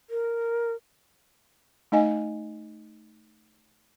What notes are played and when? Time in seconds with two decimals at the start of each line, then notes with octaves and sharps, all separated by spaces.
0.10 A#4
1.92 A3 D#4 D#5 G#5